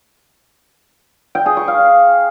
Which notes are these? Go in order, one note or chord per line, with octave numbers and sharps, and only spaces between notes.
G5
G#4
C#6
F5